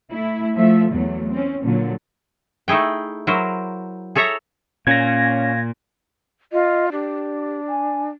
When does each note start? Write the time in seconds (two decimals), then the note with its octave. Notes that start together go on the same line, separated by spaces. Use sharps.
0.10 A3 E4
0.55 F3 A3 E5
0.91 E2 F#3 A3
1.31 C4 C#4
1.63 A#2 D3 F#3
2.68 A3 D#4 E4 G#4 G5
3.27 F#3 E4 A#4 C5
4.15 G#4 A4 C#5 E5 A#5
4.87 A#2 C#4 F5 G#6 A#6
6.52 F4 D#5
6.92 D4 G4
7.68 G#5